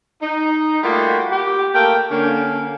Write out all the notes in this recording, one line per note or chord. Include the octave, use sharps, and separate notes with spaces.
D#4
G3 A3 A#3 F4 F#4 F#5
G4
A3 A#3 A#4 G5
D3 A#3 C#4